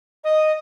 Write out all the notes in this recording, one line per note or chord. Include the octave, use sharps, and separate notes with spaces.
D#5